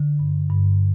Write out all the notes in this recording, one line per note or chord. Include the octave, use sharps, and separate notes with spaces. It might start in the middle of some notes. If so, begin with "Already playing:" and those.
Already playing: D3
G2
G2